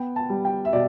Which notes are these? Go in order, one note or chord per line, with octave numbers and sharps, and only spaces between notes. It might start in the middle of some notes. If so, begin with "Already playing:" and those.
Already playing: B3 G5
A5
G3
G5
E5
B2 D5